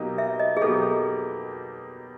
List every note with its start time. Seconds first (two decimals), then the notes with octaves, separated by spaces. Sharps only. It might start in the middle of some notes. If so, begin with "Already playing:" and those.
Already playing: B2 F#3 A#3 D#4 G4
0.18 E5
0.39 D#5
0.57 G#4
0.61 B2 F#3 A#3 D#4 G4 A4